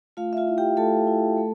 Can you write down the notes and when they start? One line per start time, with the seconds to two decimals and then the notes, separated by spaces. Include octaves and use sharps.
0.17 A3 F4 F5
0.33 E5
0.37 F4 F5
0.47 E4
0.58 G4 G5
0.77 A3 A4 A5
1.07 E4
1.37 A3